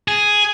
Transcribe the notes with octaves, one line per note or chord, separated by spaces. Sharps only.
G#4